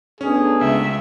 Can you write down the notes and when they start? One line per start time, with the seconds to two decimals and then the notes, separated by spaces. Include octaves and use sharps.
0.21 D2 B3 C#4 D4 G#4
0.61 C#2 E5